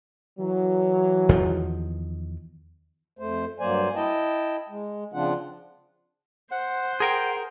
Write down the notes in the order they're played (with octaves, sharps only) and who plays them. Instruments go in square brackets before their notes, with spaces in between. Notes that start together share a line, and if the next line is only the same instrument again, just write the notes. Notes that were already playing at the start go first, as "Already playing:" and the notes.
[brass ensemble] E3 F#3
[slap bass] E2 D#3 F3
[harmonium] F2 A3 C5
G2 F#3 A#3 C5 D5 G#5
E4 D#5 G5 A5
G#3
C#3 F3 C4 D4 F4 F#5
[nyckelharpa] C5 [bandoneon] F#5
[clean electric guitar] G#4 A#4 G5 [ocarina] F#5 [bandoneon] C6